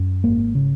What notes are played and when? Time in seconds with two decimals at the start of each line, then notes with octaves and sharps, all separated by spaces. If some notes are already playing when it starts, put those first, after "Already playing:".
Already playing: F#2
0.24 G#1 A#3
0.55 C#3